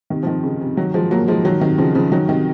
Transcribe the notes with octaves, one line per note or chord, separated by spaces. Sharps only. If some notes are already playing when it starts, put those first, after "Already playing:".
C3 D#3
F3
C3 D#3
C#3
C3
D#3 F#3
F3 G#3
F#3 A#3
F3 G#3
D#3 F#3
C3 D#3
C#3 F3
C#3 F3
D#3 F#3
C3 D#3